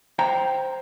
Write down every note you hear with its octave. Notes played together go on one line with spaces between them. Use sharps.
C5 G5 A#5